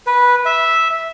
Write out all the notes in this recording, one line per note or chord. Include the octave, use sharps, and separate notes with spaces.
B4
E5